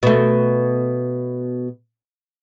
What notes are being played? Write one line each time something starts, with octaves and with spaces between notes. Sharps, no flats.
B2 A3